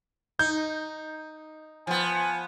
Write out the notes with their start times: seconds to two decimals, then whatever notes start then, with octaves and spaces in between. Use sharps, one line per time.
0.39 D#4 G6
1.87 F3 B3 G#5